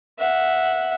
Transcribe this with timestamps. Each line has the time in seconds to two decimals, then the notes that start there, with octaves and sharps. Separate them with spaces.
0.19 E5 F#5